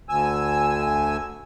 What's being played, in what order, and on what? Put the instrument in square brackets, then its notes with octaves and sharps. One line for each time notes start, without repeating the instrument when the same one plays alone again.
[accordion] D2 G#5 E6